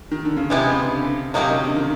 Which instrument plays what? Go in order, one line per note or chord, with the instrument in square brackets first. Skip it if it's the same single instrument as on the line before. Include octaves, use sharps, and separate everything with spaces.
[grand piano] D#3
D3
C#3
[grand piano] C3 [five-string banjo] E3 G#3 B3 E4 G4
[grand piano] C#3
D3
[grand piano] C3 [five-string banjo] F#3 A#3 D#4 G4 A#4
[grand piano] C#3
D3
D#3